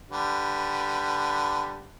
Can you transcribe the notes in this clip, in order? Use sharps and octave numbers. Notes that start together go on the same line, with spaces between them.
D3 G3 B4